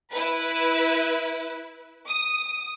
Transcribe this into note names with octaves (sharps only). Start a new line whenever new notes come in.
E4 B4
D#6